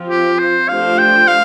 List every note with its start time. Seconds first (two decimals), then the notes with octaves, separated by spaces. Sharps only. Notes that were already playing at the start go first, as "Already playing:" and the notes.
Already playing: F3 C4 F4
0.10 G4
0.39 C5
0.69 F3 A3 D4 G4 C5 F5
0.98 G5
1.28 F5